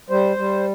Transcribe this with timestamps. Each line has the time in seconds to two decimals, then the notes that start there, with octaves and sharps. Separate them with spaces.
0.10 G3 C5
0.37 G3